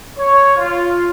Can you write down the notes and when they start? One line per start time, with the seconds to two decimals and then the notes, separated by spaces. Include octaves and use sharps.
0.18 C#5
0.57 F4